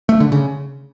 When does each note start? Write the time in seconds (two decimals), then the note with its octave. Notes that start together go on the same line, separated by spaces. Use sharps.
0.09 A3
0.20 D3
0.32 C#3